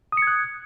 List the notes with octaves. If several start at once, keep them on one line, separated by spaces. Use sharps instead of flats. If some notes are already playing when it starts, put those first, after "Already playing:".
D#6 F#6 G#6 C#7